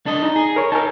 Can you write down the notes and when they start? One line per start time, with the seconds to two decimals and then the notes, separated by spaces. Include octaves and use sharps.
0.06 D4 A4 D#5
0.23 D#4 A#5
0.36 G#4
0.56 A#4 C#5
0.72 D#4 A#4 G#5 A5